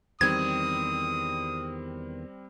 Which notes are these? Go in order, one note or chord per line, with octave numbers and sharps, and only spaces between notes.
E2 D#3 G3 C4 D#6 G#6